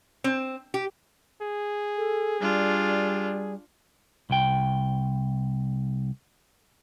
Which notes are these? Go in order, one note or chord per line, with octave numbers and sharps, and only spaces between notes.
C4
G4
G#4
A4
G3 D4 F4
C2 G5